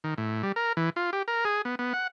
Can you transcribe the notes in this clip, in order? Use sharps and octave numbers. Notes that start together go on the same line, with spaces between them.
D#3
A2
G3
A#4
E3
F4
G4
A#4
G#4
B3
B3
F#5